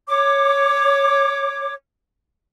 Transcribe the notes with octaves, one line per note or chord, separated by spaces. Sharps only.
C#5 D6